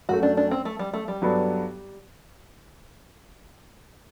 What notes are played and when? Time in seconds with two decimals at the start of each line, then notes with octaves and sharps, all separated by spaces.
0.09 F#2 F#3 A3 F#4
0.23 D4
0.37 D4
0.51 C4
0.65 A3
0.79 G3
0.94 A3
1.08 G3
1.22 G2 F#3 B3 D4 A4